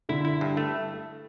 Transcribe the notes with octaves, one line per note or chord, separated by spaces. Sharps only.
D3 E4
E4
G2
A3